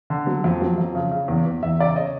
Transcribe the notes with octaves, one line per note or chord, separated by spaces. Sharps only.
D3
F#3
F2
F#3
F2
C#3
C#3
E2
E2
E2 E5
C#3 D5 E5
C#3 C#5 D#5